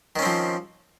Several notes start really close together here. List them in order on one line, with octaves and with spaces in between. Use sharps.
D#3 C#4 C4 F3